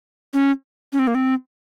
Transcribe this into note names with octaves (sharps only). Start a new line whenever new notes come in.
C#4
C#4
C4
A#3
C4